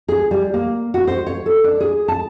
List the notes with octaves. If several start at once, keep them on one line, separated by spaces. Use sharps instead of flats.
G#4
G3
A#3
F#4
C5
C#5
A4
D4
G#4
A5